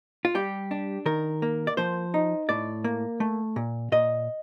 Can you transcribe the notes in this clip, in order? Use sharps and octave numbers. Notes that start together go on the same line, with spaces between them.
F4
G3 G4
D4
D#3 A#4
A#3
D5
F3 C5
D#4
A2 D5
A#3
A3
A#2
A#2 D#5